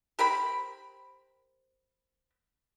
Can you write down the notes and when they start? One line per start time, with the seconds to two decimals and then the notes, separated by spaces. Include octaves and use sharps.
0.19 G4 A#4 C5 B5